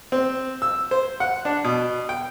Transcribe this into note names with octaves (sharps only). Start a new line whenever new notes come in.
C4
E6
C5
F#5
D4
B2
G5